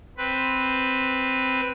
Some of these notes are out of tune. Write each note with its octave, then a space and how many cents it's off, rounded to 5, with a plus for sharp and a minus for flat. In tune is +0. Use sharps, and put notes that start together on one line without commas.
C4 +0 B4 +0